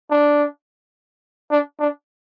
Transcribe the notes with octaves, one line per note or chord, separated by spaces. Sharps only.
D4
D4
D4